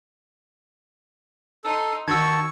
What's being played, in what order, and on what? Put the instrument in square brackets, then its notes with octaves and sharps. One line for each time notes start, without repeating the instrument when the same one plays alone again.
[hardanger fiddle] D#4 C6 [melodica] A4
[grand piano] D#3 F#4 [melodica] A5 [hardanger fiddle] C#6 [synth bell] E6 G#6